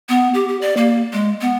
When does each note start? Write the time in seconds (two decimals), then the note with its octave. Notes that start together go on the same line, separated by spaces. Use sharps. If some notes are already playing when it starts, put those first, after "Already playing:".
0.09 B3
0.34 G4
0.48 G4
0.61 D5
0.77 A#3
1.13 G#3
1.41 B3